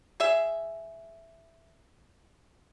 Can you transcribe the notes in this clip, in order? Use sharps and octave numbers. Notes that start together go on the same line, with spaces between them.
G#4 E5